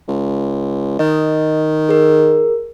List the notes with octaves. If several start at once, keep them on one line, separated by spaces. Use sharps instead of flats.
C#2
D#3 D#5
G#4 A#4